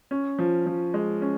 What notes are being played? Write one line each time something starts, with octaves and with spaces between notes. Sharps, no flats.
C#4
F3
F3
G#3
C#4